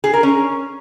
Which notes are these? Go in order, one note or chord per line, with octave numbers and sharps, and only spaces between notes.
G#4
A#4
C#4